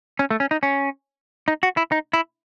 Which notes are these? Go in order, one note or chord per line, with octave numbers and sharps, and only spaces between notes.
C#4
A3
C#4
D#4
C#4
D#4
F#4
E4
D#4
E4